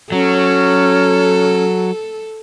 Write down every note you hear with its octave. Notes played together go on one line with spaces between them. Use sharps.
F#3 C#4 A4